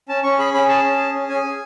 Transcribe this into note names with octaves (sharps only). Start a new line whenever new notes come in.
C#4 A5
C#4 C#6
G#4 B5
C#4 B5
G#4 A5
C#4
G#4
C#4
C#4 G#5
G#4